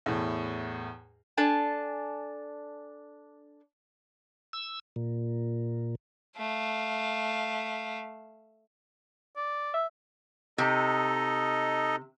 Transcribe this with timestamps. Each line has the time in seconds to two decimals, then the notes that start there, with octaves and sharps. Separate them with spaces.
0.06 E2 A2
1.37 D4 A4 G#5 A5
4.53 E6
4.96 A#2
6.37 A3 F5
9.36 D5
9.74 E5
10.58 C3 D#4 A4 D#5